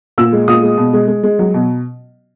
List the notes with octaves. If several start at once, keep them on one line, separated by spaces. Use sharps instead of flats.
A#2 E6
G#3
A#2 D#6
G#3
B2
G#3
G#3
G#3
F#3
B2